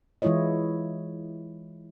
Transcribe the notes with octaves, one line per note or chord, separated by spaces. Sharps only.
E3 G#3 E4 F4 C#5 D#5